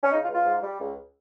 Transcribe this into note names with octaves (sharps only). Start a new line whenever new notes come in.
C#4
C#3 D#4
F4
C#2
F4
G#2
G3
C#2